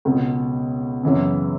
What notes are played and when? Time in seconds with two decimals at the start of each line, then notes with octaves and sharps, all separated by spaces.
0.05 C#2 B2 G#3
1.03 F#2 C#3 E3 B3